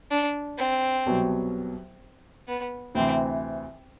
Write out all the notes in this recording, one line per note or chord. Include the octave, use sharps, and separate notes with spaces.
D4
C4
C2 B2 F#3 B3
B3
D2 C3 E3 C4